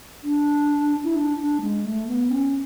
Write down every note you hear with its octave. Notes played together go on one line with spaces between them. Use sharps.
D4
E4
D4
D4
G#3
A3
B3
C#4